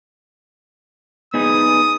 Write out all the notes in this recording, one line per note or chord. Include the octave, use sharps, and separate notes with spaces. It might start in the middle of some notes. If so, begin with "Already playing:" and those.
B3 D#4 G#4 D#6